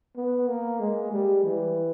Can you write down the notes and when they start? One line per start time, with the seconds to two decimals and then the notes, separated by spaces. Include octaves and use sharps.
0.16 B3
0.48 A#3
0.80 G#3
1.12 G3
1.45 E3